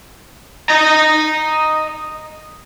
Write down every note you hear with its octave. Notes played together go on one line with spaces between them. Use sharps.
D#5 A#5